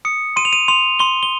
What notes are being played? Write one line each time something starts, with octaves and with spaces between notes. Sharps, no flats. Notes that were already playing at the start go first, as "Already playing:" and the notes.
D#6 C#7
C6 D#7
F7
D#7
C6 F7
C6 G7
G7